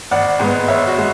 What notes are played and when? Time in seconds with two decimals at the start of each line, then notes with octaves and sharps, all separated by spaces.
0.11 G#1 D5 F#5
0.39 G#2 G#3 B3
0.68 G#1 C#5 E5
0.88 F#4
0.98 G#3